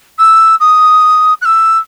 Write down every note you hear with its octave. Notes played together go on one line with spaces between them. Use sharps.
E6
D#6
F#6
E6